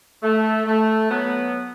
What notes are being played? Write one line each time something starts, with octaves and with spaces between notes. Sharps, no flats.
A3
A3
F#3 B3